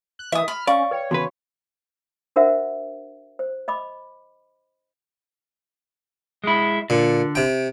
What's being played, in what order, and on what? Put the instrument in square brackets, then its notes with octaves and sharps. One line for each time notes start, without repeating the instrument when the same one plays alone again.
[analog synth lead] F#6
[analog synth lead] E3 [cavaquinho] E5 D#6
[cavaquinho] B5 [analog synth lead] F6
[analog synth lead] C#4 [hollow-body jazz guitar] D5 [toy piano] F5 [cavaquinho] C#6
[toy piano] B4 G5 [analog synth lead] C#5
[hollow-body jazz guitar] E2 C#3 B4 [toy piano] F#4 C6
[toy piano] D4 F#4 A#4 C5 E5 F#5
C5
D#5 B5 D6
[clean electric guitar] G#3 E4
[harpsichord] A#2 [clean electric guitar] D3
[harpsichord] C3 G5